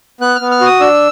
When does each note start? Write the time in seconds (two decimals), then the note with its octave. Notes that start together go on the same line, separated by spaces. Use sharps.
0.21 B3 F#6
0.35 F6
0.41 B3
0.51 F6
0.61 F#4 D#6
0.80 D4 E6